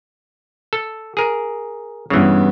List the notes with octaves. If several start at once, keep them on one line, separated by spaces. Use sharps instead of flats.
A4
G#4 A#4
G2 C#3 E3 B3